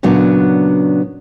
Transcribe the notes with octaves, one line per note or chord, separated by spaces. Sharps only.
A#2 C#3 F#3 B3 D4